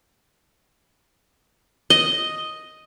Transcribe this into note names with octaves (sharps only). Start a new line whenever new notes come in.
D#5